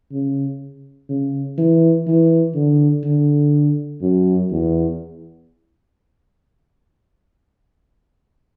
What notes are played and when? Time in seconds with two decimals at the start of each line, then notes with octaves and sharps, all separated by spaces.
0.12 C#3
1.09 C#3
1.58 E3
2.07 E3
2.55 D3
3.04 D3
4.01 F#2
4.51 E2